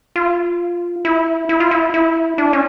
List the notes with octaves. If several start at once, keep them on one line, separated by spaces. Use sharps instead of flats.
F4
E4
E4
F4
E4
E4
D4
C#4